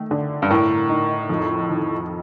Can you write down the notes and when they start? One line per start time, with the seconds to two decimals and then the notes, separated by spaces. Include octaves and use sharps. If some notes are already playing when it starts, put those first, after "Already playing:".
Already playing: D#3 A3
0.11 D3
0.42 G2
0.50 A2 A#4
0.90 D#4
1.29 F2
1.69 D#3